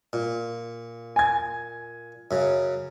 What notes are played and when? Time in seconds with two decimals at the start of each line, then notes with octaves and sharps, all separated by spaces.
0.13 A#2
1.16 G#5 G#6
2.31 F#2 C#3